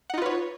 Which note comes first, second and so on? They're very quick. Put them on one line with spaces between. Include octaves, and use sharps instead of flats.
F#5 D#4 F4 B4 C#5